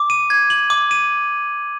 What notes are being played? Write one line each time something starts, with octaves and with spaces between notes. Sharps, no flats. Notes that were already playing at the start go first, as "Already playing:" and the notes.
Already playing: D6
D#7
G#6
F#7
D6
D#7